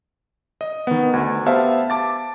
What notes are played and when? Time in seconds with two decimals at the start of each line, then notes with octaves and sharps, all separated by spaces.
0.61 D#5
0.87 D#3 B3
1.13 D2
1.46 B3 G4 C5 E5 F5 A5
1.90 A5 D6 A6